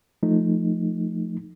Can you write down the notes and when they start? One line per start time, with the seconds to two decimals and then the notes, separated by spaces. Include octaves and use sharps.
0.23 F3 A3 D#4